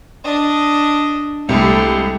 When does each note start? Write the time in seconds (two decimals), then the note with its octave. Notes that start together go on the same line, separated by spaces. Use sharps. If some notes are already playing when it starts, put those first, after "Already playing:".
0.24 D4 D#5
1.49 C2 G#3 A3 G4 A4